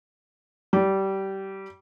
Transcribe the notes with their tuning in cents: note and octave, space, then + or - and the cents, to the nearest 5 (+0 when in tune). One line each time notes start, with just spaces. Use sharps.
G3 -20